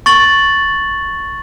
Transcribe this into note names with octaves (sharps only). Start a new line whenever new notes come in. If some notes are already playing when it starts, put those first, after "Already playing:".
C#6 A6 F#7